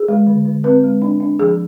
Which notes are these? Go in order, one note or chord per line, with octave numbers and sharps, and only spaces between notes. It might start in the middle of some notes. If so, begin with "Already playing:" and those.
Already playing: G#4
G#3
D3
D3
C4 B4
G#3
D4
D4
F3 G#4